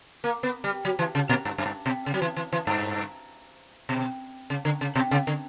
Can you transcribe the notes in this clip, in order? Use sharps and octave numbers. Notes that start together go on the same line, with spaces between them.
A#3
B3
G3
F#3
E3
C#3
A#2
G2
F#2
G2
B2
C#3
F#3
E3
E3
E3
G2
B2
C#3
D3
C#3
B2
C#3
D3